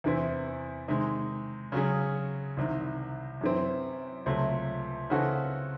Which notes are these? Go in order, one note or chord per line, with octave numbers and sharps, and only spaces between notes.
E2 C3 E3 C4 E4
C3 D#3 G#3
C#3 F#3 C#4 G#4
C2 C3 D#3
F#2 E3 C4
C#2 C3 F#3 A3
C#3 E3 C4 F#4 A4